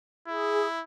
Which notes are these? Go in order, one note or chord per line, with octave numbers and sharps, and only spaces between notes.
E4 G#4